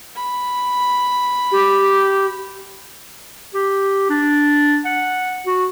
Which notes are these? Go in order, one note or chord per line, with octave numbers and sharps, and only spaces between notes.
B5
G4
G4
D4
F#5
F#4